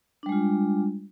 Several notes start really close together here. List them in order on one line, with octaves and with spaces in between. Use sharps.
D4 G3 G#3 F4